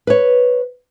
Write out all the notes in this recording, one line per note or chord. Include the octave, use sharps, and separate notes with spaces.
B4 C#5